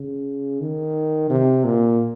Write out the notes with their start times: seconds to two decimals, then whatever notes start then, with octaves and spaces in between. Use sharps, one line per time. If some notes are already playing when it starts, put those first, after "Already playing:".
Already playing: C#3
0.61 D#3
1.30 C3
1.65 A#2